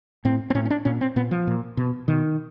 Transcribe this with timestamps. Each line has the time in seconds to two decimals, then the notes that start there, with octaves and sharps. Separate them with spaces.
0.25 A2 C4
0.50 C4
0.55 A2 C#4
0.66 C#4
0.70 D4
0.85 A#2 C#4
1.01 C4
1.16 A#2 B3
1.31 F3
1.47 A#2
1.77 B2
2.08 B2 D#3